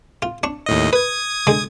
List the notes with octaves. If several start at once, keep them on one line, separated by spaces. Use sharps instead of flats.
F4
D4 C#6
D#2 A2 D#5
B4 D#6 G#6
D3 G#3